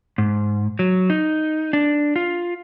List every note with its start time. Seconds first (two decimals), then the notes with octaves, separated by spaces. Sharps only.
0.18 G#2
0.79 F#3
1.10 D#4
1.73 D4
2.16 F4